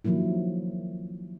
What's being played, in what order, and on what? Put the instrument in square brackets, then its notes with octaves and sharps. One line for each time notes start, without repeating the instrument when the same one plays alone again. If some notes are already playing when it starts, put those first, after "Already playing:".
[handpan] D#3 F3 F#3 A#3 E4